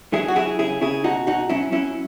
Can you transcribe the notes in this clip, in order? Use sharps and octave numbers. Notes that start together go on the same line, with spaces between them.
F#3 E4 G#4
F#4
F#3 E4 G#4
C#3 E4 G#4
C#3 E4 G#4
B2 D#4 F#4
B2 D#4 F#4
F#3 C#4 E4
F#3 C#4 E4